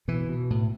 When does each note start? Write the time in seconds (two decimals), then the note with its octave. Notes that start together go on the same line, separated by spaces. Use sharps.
0.08 B2 E3
0.29 B2
0.50 A2